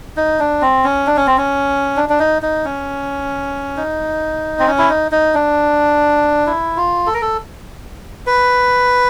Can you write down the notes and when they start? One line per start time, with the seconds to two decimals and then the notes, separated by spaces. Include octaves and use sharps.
0.17 D#4
0.39 D4
0.62 C4
0.84 C#4
1.07 D4
1.17 C#4
1.27 C4
1.38 C#4
1.97 D4
2.09 D4
2.19 D#4
2.42 D#4
2.65 C#4
3.77 D#4
4.59 C4
4.67 C#4
4.78 E4
4.89 D#4
5.12 D#4
5.34 D4
6.47 E4
6.77 F4
7.06 A4
7.14 A#4
7.22 A4
8.27 B4